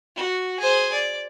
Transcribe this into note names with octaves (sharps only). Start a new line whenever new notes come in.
F#4
G#4 C5
D5